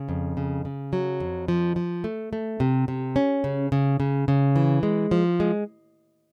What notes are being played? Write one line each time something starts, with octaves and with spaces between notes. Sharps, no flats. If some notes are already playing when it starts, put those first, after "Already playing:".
Already playing: C#3
F2
C#3
C#3
F#3
F2
F3
F3
A3
A3
C3
C3
C#4
C#3
C#3
C#3
C#3
E3
G#3
F3
G#3